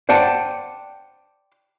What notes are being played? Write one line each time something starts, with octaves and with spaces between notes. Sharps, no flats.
C5 D5 F#5 G5 A5